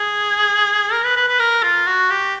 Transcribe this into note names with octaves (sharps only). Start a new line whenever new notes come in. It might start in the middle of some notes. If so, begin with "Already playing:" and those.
Already playing: G#4
A#4
B4
B4
B4
A#4
F4
F#4
G4